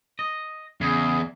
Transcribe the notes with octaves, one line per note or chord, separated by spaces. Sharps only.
D#5
E2 C#3 G#4